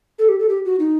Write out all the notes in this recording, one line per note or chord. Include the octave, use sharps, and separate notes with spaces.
A4
G4
A4
G4
F#4
D#4